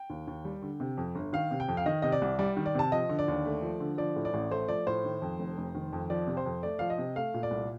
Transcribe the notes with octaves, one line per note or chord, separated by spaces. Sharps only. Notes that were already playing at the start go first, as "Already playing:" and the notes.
Already playing: G5
D#2
D#2
G3
D3
C3
F2
G1
D#3 F5
C3
G5
F2
F5
D#3 D#5
C3 D#5
D5
C2
G3 D5
D#3
D5
C3 A5
F3 D#5
D3
D5
D#2
A3
F3
D3
F3 D5
A2
D5
A1
A3 C5
F3 D5
A2 C5
D#3
F2
F1
F1
D#3
F2
F3 D5
C3
C5
F2
A3 D5
F3 F5
D#5
C3
A3 F5
A#2
D5
C2